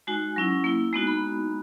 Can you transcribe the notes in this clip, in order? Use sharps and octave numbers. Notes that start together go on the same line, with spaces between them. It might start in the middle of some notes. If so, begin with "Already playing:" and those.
G#3 D#4 F#4 G#5
F#3 C#4 E4
A#3 E4
G#3 B3 D#4 F#4 A#5
B5